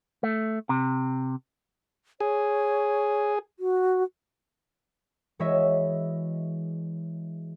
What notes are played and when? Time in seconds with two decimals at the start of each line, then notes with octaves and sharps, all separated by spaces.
0.23 A3
0.69 C3
2.20 G#4 C#5
3.59 F#4
5.39 E3 G#3 F#4 C#5 D#5 E5